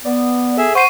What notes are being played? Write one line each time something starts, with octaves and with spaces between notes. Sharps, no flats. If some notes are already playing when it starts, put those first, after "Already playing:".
B3 D5
G#4 A4 E5
C5 F#5 C#6 C7 D#7